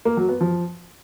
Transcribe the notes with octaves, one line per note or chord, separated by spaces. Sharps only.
A#3
F#3
B3
F3